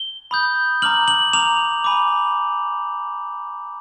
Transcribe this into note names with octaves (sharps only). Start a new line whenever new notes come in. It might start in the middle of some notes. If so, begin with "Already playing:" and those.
Already playing: G7
B5 D#6 G6
A#5 D6 F6 F#7
F#7
A#5 D6 F6 F7
G#5 B5 D6